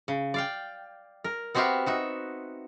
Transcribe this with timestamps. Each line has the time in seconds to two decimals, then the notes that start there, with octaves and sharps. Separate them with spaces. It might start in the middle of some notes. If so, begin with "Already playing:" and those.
0.08 C#3
0.34 D5 F5 G5
1.24 A#4
1.55 B3 C4 F#4 G4 E5 F5
1.86 D#4 F#4 E5